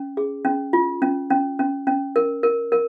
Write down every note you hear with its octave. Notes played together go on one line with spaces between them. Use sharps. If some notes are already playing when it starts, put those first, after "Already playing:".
Already playing: C#4
G#4
C#4
F4
C#4
C#4
C#4
C#4
A#4
A#4
A#4